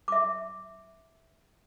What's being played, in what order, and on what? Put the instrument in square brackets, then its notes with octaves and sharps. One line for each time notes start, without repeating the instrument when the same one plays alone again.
[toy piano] E5 D6